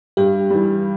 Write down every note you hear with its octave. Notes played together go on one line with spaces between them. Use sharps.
G2 G4
E3 G3